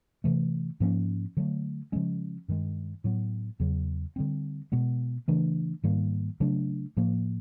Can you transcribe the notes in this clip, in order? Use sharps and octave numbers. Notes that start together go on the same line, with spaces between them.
C3 E3 A3
G#2 F3 A#3 C#4
D3 F#3 A3
C#3 F3 G#3 C#4
G2 D#3 G#3
A2 F#3 B3
E2 C#3 F#3
D3 G3 C4
B2 G#3 B3
C#3 E3 A3 D4
G#2 D#3 G3 A#3
C#3 F#3 A3 D4
A2 F3 A#3